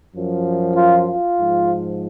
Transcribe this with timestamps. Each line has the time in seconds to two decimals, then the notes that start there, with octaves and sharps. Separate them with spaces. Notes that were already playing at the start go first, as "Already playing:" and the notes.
0.14 F#2 F3
0.76 F4
1.06 F4
1.38 G#2 F3